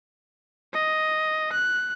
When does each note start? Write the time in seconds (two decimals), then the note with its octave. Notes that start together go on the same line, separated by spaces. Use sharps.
0.73 D#5
1.52 F#6